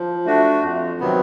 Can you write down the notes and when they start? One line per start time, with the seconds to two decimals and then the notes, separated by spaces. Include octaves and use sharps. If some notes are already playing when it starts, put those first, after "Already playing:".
Already playing: F3
0.26 A3 D4 F#4
0.63 F2
1.00 C3 D#3 F#3 B3